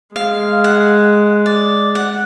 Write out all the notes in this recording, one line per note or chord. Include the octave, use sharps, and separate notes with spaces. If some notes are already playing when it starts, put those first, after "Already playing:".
G#3 F5
F#5
D5
F#5